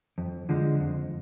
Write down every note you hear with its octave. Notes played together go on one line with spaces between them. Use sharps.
F2
D3 F3 G#3
F2